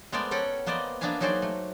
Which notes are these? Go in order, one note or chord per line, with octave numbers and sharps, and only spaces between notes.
G#3 A3 B3 A#4 C5 D5
C#4 A4 F#5 G5
A#3 B3 C5 D5 D#5
A#3 B3 D4 E5 F5 G#5
F#3 D#4 F#4 G#4 C5 D5
A3